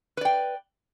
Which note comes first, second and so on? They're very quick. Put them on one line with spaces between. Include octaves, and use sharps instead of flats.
B4 D5 G5